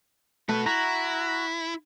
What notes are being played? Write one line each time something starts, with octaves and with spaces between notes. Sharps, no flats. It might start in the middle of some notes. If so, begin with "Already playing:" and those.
A3 F#4 B4
E4 F#4 A#5